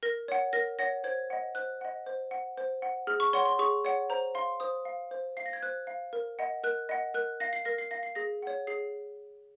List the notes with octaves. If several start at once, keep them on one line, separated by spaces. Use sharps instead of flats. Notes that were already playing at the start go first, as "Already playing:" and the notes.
A#4 A#6
C#5 F#5
A#4 A#6
C#5 F#5 A#6
C5 G#6
D#5 F#5
C5 F#6
D#5 F#5
C5
F#5
C5
F#5
G#4 F6
C#6
C#5 F#5 C6
C6
G#4 C#6
C#5 F#5
C5 A#5
F5 C6
C5 D#6
F5
C5
F5 C7
A#6
G#6
C5 F#6
F5
A#4
D#5 F#5
A#4 F#6
D#5 F#5
A#4 F#6
F5 A#6
C7
A#4 A#6
C7
F5 A#6
C7
G#4 A#6
C#5 F#5
G#4 C7